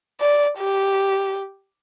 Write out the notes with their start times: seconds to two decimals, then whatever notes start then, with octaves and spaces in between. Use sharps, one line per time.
0.20 D5
0.58 G4